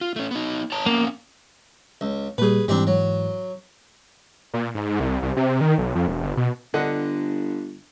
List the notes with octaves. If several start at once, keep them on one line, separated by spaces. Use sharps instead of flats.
F4
A3 C#4
B3 D#4
C#5 A5 A#5
A#3 B3 C#4 F5
C#2
A#2 G3 G#4 B4
G#2 E3 G3 C4 D4
F#3
A#2
G#2
C2
C2
C3
D#3
B1
F2
E1
G1
B2
G1 D3 D#5 F#5